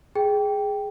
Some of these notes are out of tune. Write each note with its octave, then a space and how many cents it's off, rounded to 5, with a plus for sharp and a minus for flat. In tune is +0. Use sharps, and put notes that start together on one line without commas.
G#4 +0 G5 +0